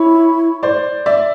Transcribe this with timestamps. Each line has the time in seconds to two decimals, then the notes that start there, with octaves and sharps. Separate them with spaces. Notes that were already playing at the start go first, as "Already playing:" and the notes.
Already playing: E4 C#5
0.63 C5 D5
1.06 D5 E5